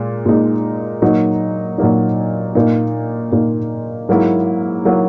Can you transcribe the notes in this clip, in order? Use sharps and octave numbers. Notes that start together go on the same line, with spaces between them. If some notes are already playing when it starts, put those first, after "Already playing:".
Already playing: A#2 G#3
A#2 G#3 D#4
A#2 F#3 A#3 D#4
A#2 F#3 A#3 D#4
A#2 A#3 D#4
A#2 A#3 D#4
G#2 F#3 A#3 E4
F#3 A#3 E4